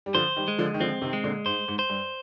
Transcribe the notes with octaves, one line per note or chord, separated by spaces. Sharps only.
G3
D3 F3 C5
D#3 G3
G#3
D3 F3
D#3
D3 F3 C4
C3 D#3
G#3
A#2 D3
G#2 C5
G#2
C5
G2